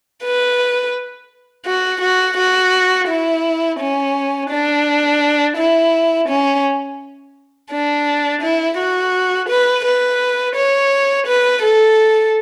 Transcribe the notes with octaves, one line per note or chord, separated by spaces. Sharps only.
B4
F#4
F#4
F#4
E4
C#4
D4
E4
C#4
D4
E4
F#4
B4
B4
C#5
B4
A4